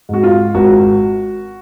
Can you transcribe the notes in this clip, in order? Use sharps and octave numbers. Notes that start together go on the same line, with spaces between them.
G#2 F#4
F4
G#1 F#4